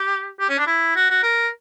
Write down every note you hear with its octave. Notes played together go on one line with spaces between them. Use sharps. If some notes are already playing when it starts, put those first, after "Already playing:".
Already playing: G4
G4
C#4
D4
E4
F#4
F#4
A#4